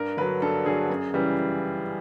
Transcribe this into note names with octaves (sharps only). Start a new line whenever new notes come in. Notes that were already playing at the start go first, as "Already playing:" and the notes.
Already playing: G2 A#4
D3 F#3 B4
G2 A4
D3 F#3 G#4
F#2
C#3 E3 G3